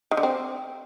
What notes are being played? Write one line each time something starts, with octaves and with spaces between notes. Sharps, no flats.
D#3
D3
C4